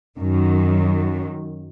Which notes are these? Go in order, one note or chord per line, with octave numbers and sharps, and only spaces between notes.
F#2 D#3